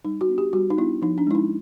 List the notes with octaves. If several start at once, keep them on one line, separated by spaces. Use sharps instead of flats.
G3 D#4
F#4
B3 D4
G4
G3 F#4
D#4
B3 D4 E4
F3 D#4
D4
G#3 C#4 E4
D#4